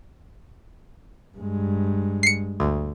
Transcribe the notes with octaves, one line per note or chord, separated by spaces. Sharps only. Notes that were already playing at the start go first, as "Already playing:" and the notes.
G2 G#3
C7 C#7
D2